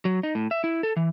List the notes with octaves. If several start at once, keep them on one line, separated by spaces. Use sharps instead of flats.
F#3
D#4
A2
E5
E4
A4
E3